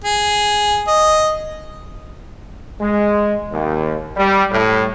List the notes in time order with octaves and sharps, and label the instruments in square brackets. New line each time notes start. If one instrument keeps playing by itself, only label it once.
[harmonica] G#4
D#5
[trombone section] G#3
D#2
G3
A2